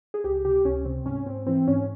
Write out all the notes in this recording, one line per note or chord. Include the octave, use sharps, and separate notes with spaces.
G#4
C#2 G4
C3 G4
C#2 C#4
C3 C4
G#2 C#4
G#2 C4
E3 C4
G#2 C#4